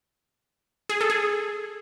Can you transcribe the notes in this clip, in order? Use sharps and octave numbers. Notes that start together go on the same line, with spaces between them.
G#4
A4
G#4